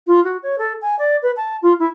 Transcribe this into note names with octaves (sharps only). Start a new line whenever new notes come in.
F4
F#4
C#5
A4
G#5
D5
B4
A5
F4
E4